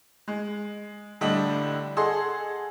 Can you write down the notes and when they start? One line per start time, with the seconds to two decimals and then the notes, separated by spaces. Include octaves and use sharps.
0.28 G#3
1.21 A2 D3 G3 D4 D#5
1.97 G#4 A4 D#5 F#5 C6